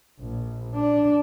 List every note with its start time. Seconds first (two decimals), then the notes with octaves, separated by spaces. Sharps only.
0.20 A#1
0.75 D4